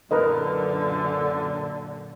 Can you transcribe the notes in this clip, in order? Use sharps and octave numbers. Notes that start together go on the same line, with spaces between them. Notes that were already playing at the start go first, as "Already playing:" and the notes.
F#2 A#2 D3 A#4 B4 D#5